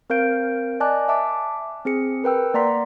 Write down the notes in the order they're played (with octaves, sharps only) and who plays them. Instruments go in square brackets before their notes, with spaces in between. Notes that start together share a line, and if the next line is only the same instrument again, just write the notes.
[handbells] C4 A#4 F5 G6 D7
D5 D#5 G#5 A5 D6 F#6
E5 A5 D6
C4 G#4 C#7
A#4 B4 G5 E6
A#3 D5 F#5 A#5 C6 B6